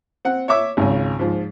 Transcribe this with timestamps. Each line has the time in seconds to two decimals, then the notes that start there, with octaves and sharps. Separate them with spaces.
0.25 C4 F#5
0.48 C#5 E5 D6 E6
0.77 G#1 C#2
1.19 G#2 F3